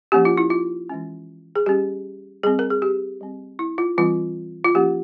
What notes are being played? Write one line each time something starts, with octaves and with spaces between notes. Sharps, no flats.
F3 A#3 C#4 G4
F4
E4
F4
E3 G#3 C#4
G#4
G3 C#4 G4
G3 C4 G#4
A#4
G#4
G4
G3 C4
E4
F4
E3 G3 C4 F4
F4
F3 A#3 C#4 G4